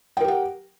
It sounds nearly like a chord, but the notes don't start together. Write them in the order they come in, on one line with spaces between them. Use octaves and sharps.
G5 A#4 G4 F#5